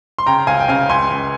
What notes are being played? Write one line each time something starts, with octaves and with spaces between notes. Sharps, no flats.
C6
C#3 G5 A#5
C#2 F5 G#5
G5
C#3 F5 G#5
C#2 G#5 C6
C#2